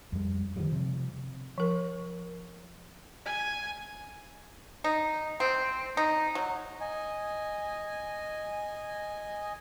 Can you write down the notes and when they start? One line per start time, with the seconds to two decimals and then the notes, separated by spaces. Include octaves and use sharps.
0.13 F2 G3
0.56 D3 D#3 F3 G3
0.72 C3 F3 C4
1.58 F3 A#4
3.25 G#5
4.84 D#4
5.40 C4
5.97 D#4
6.35 F#3
6.81 D#5 G#5